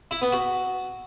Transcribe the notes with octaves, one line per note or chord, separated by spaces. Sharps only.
E4
B3
F#4